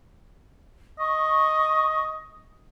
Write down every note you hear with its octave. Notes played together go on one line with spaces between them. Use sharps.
D#5 C#6